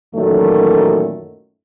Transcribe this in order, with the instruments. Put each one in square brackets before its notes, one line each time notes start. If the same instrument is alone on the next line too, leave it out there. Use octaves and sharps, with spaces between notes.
[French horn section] F#2 A#2 D#3 E3 F#3 A3